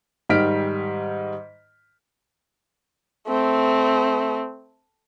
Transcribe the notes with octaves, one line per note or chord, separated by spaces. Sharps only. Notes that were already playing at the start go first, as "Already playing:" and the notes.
G#2 D#3 G3 F6 B6 D7
A3 C4